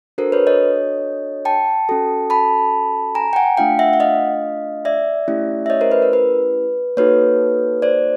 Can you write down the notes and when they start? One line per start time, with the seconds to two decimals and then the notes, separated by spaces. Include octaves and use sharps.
0.18 D4 F#4 A4 A#4 C5
0.32 B4 C#5
0.47 C#5 D#5
1.45 G5 A5
1.89 C#4 F#4 A4
2.30 A5 B5
3.15 G#5 A#5
3.33 G5
3.36 F#5 G#5
3.57 A3 D4 F4 F5 G5
3.79 E5 F#5
3.93 F#5
4.00 D#5 F5
4.85 D5 E5
5.28 A3 C#4 E4 G4
5.66 E5
5.70 C#5 D#5
5.81 A#4 C5
5.92 B4
6.02 A#4
6.13 B4
6.97 A#3 D#4 F#4 A4 B4 C#5
7.82 C5 D5